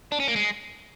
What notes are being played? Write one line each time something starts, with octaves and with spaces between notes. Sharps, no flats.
D4
C#4
A#3
G#3